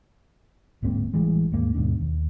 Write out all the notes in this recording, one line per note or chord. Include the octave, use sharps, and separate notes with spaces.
D1 G#2 A#3 C4
A1 E3 G3 G#3
D#2 G#2 A#3
D#2 G#2 B2 D4
D#2